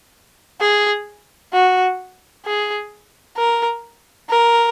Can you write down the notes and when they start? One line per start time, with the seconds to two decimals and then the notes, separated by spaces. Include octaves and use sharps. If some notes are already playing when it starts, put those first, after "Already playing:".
0.61 G#4
1.53 F#4
2.45 G#4
3.37 A#4
4.30 A#4